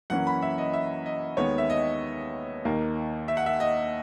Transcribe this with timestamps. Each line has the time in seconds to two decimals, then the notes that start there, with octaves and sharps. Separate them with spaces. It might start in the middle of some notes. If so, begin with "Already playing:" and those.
0.10 F#2 E3 A#3 C#4 F#5
0.27 B5
0.42 E5
0.58 D#5
0.73 E5
1.06 D#5
1.37 D#2 D#3 G#3 B3 C#5
1.58 E5
1.70 D#5
2.65 D#2 D#3 A#3
3.28 E5
3.37 F#5
3.46 E5
3.60 D#5